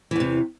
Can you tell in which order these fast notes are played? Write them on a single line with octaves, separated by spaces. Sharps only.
E3 E2 C3